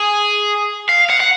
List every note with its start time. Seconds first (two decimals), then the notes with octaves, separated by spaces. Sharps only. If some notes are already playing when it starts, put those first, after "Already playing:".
Already playing: G#4
0.89 F5
1.10 F#5
1.20 F#5